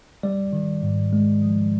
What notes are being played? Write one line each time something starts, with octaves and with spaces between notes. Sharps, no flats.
G3 D5
D#3
G#2
G#3
F3